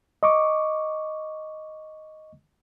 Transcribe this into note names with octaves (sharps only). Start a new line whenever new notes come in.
D#5 C#6 D6